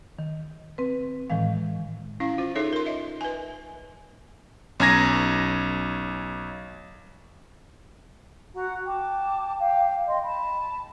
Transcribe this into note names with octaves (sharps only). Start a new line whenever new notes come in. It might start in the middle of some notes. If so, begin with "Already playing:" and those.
D#3
C4 B4
A2 D#3 E3 G#3 F5
C#4 E4 F5
F4 C5
D#4 F4 G#4 A4 C#5 E5
A#4 C6
D#5 E5
B4 G#5
B1 C#4 G#5 A#5 G#6 A#6
F#4 F#5 A#5
G5 A5 D6
F5 G5
D#5 C6
A5 B5